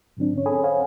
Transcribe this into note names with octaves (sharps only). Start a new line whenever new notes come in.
G#2 D3 F#3 C4 D4
C#4 C#5
G#4 A4 C#5 G#5 B5 D#6
C5 C#5 F5 F#5 G#5